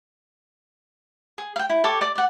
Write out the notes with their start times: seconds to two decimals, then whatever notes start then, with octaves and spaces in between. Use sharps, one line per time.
1.38 G#4
1.56 F5 G5
1.69 E4
1.84 G4 A4 C#5 D6
2.01 D5 D6
2.15 D5 F#5